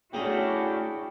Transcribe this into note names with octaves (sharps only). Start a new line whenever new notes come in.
A3 C#4 D4 E4 F#4 G#4 G5 A#5